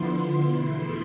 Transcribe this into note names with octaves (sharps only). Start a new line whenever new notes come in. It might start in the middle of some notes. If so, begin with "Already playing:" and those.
Already playing: D3 F3 B3 E4 C6
E2 B2 A3 E4 C6